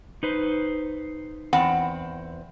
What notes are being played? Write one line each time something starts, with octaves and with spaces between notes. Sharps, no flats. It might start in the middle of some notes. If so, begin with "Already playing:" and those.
D#4 B4 C5
E2 C4 F#5